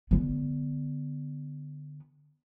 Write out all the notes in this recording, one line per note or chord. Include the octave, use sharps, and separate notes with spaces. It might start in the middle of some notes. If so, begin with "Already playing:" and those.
D3 B3